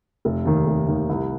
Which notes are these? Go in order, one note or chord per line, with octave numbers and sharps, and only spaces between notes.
F1
D#2 D#3
F1
D#2 D#3
C2